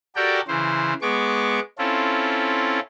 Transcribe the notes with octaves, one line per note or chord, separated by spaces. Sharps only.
F#4 G4 A4 A#4 D5 G5
C#3 E3 C5
G#3 B3 C#6 D6
C4 C#4 E4 F4 A4